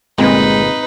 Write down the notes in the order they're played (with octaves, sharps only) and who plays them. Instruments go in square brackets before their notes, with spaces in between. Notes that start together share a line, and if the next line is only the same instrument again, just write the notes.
[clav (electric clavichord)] G1 A#2 [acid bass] G#3 [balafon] C4 [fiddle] D#4 B4